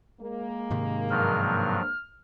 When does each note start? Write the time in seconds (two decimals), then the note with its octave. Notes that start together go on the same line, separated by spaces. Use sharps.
0.20 G#3 A#3
0.71 G#2 C3 D#3
1.10 G2 F3 F#3 F6